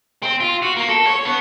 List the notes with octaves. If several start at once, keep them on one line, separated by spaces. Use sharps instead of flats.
C4
F4
F#4
A#3
A4
C#5
B3